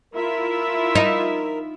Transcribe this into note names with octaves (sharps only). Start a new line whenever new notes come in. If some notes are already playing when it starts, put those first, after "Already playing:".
E4 F4 A#4 E5
D#4